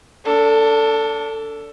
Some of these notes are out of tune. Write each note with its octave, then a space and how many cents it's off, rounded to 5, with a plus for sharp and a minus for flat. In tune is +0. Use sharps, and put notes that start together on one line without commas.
D4 -25 A4 +15